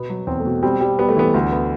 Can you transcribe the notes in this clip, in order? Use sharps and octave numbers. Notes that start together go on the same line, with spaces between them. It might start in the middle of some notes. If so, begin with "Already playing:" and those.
Already playing: B2 B3
F#3
E2 C4
A3
B2
G3 C4
G3
G3 B3
A3
E3 B3
D2
B3